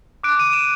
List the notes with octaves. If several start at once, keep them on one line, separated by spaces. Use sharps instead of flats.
D6 F#6 D7
D#7
E7